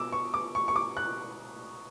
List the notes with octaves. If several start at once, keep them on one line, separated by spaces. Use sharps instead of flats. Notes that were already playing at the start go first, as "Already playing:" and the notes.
Already playing: B2 D6 E6
C#6
D6
C#6
C#6
D6
F#6